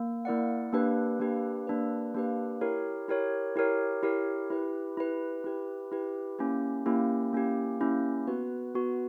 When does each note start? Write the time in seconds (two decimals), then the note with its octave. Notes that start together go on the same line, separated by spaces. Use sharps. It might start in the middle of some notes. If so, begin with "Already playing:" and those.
Already playing: A#3
0.25 A#3 E4 A#4 D5 F#5
0.72 A#3 D4 G4 B4
1.20 A#3 D4 G4 B4
1.67 A#3 D4 G4 B4
2.15 A#3 D4 G4 B4
2.61 E4 G4 A#4 C#5
3.08 E4 G4 A#4 C#5
3.56 E4 G4 A#4 C#5
4.02 E4 G4 A#4 C#5
4.50 E4 G4 B4
4.97 E4 G4 B4
5.44 E4 G4 B4
5.92 E4 G4 B4
6.39 A#3 C#4 E4 G4
6.86 A#3 C#4 E4 G4
7.33 A#3 C#4 E4 G4
7.80 A#3 C#4 E4 G4
8.27 B3 F#4 B4
8.74 B3 F#4 B4